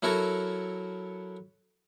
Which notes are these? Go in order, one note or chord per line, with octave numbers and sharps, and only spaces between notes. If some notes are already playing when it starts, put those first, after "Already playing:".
F#3 E4 F#4 A4 A#4 C#5